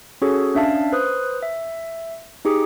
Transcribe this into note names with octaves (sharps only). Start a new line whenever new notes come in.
C#4 F#4 G#4 A4 C#5
C#4 D4 E5 F5 A5
B4 C5 D#6 F#6
E5
D#4 G4 G#4 D6 D#6